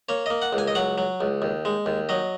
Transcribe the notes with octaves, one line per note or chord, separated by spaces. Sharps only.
A#3 C#5
A#3 D#5
F#5
C#2
G#5
D#5
F#3 F#5
F#3
C#2
D#2
G#3
D#2
F#3 D#5